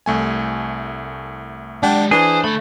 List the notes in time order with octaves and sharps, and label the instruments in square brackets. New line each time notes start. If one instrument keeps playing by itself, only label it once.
[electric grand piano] C2 A3 G#5
[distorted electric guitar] G#3 G4 [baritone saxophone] D4 [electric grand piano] D5 F#5 G5
[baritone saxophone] E3 [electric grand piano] D4 [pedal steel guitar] G#4 [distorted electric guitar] C5
[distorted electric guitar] D3 B5 [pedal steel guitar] A3